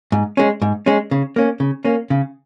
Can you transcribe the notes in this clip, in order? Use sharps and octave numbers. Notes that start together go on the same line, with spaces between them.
G#2
G#3 C#4
G#2
G#3 C#4
C#3
A#3 C#4
C#3
A#3 C#4
C#3